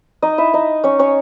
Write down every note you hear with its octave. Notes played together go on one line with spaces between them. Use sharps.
D#4 D#5
E4 E5
D#4 D#5
C#4 C#5
C#4 C#5